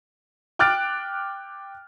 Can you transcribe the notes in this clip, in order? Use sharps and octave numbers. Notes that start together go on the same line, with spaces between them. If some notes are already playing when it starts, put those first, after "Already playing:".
G5 D6 F6 F#6 A6 D7